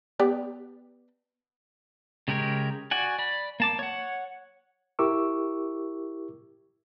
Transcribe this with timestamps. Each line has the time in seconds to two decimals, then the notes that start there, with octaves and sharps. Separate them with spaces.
0.19 B3 G4 D5
2.28 C#3 G#3 G4 A#4 C#5
2.91 F#4 D5 F#5 G#5
3.18 D5 B5
3.60 A#3 A5 D6
3.79 C#5 F#5
4.99 E4 G4 A#4 C#6 D6 E6